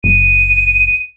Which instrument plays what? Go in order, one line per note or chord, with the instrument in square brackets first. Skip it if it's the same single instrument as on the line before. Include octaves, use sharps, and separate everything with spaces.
[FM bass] F#1 [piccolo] D#7